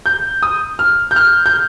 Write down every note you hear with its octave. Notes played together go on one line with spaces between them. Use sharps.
G6
D#6
F6
G6
F6
G6